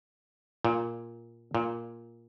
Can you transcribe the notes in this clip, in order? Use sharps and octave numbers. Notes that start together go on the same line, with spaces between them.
A#2
A#2